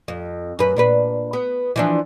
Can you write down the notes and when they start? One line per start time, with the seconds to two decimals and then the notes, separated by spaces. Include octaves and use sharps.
0.08 F2
0.59 F#2 B4
0.76 A#2 D4 B4
1.33 B3
1.76 E3 F3 D4